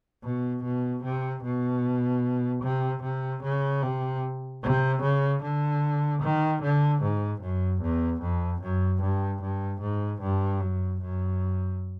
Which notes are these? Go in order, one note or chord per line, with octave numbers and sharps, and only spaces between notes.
B2
B2
C3
B2
C3
C3
C#3
C3
C3
C#3
D3
D#3
D3
G#2
F#2
E2
F2
F#2
G2
G2
G#2
G2
F#2
F#2